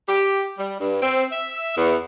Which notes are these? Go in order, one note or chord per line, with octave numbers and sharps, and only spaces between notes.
G4
G3
G2
C4
E5
E2